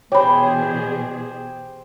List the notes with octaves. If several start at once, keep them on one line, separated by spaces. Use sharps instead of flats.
B2 E3 G4 G#4 C5 C#5 B5